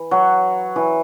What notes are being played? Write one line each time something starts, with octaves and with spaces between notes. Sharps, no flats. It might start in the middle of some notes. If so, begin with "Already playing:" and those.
Already playing: E3
F#3
E3